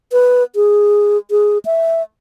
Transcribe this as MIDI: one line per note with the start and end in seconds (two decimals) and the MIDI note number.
0.12 0.43 71
0.56 1.17 68
1.31 1.58 68
1.65 2.02 76